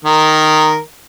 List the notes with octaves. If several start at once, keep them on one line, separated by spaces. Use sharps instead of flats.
D#3 A#4